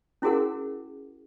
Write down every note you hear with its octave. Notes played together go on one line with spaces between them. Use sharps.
C#4 E4 F#4 G#4 A#4 F#5